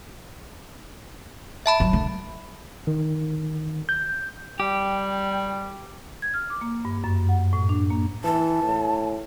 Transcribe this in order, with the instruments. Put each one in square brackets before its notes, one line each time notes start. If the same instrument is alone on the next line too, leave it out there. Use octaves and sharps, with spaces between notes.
[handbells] E5 A5 B5
[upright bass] F#3
D3
[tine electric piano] D#3
G6
[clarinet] G3 [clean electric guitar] G4 [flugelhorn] G5
[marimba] G#6
F6
D6
A#3
G2
F#2
F#5
A2
D4
A#3
[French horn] E3 [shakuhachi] A5
[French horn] A2